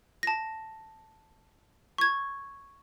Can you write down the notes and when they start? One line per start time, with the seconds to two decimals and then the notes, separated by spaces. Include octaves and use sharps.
0.23 A5 A#6
1.98 C#6 G#6